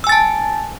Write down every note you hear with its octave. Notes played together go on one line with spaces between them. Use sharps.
G#5 A5 E6 A6